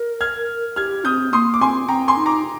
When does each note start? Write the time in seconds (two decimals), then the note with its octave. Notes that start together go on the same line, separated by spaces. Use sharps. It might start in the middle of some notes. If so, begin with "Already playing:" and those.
Already playing: A#4
0.21 F6 G#6
0.76 G4 F6 G#6
1.04 C4 D#6 G6
1.33 A#3 C6 D#6
1.54 D6
1.61 C4 G#5 C6
1.88 C4 G5 A#5
2.08 G#5 C6
2.17 D#4
2.26 A#5 D6